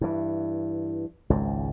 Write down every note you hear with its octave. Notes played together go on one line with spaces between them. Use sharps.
G2 E3
G#1 C#2 G#2